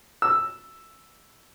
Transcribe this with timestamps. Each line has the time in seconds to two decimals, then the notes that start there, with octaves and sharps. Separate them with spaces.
0.22 E6